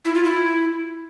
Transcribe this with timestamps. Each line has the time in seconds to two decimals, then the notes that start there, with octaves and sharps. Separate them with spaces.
0.05 E4
0.15 F4
0.24 E4